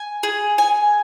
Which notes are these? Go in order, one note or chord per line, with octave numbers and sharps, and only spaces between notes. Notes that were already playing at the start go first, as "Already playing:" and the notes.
Already playing: G#5
G#4
G#5